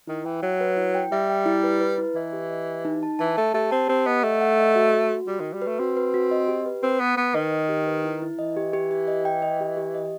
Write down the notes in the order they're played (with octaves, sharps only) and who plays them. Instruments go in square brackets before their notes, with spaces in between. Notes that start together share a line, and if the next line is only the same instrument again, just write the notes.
[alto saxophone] D#3 [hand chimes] E4
[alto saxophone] E3 [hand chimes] G5
[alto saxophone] F#3 [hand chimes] E5
[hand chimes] B4
E4
G5
[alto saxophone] G3 [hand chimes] E5
[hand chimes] G5
E4
B4
B4
E4
[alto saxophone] E3 [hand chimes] D#5
[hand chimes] G4
D#5
G4
D#4
A5
[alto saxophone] E3 [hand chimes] A5
[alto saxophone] A3 [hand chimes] A5
[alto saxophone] A3 [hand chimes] G4
[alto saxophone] C4 [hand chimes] A5
[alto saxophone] C4 [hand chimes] G4
[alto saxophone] B3 [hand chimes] D#5
[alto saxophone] A3 [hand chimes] F#5
[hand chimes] F#5
D#5
F#4
F#4
F#4
[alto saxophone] G3 [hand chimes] F#4
[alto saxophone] D#3 [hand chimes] F#4
[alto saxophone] G3
[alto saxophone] A3 [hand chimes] B4
[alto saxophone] C4 [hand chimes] F#4
[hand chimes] B4
F#4
D#5
G4
B4
[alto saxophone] C4 [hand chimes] B4
[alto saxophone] B3 [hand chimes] B4
[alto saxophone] B3 [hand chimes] B4
[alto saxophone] D#3 [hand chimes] D#5
[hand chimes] D#5
G4
B4
E4
E4
[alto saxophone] E3 [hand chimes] D#5
[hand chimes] G4
G4
G4
D#5
G5
D#5
G4
G4
D#5